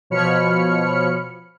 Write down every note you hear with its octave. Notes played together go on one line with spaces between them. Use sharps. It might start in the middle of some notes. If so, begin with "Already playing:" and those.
B2 F3 C#5 B5 F6 C#7